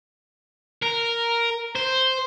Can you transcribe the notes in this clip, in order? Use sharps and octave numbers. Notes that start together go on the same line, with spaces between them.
A#4
C5